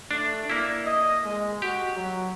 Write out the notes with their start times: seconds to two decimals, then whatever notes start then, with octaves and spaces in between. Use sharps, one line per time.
0.11 A3 D4
0.50 A#3 E4 D5
0.86 D#5
1.24 G#3
1.62 F#4 G4
1.95 F#3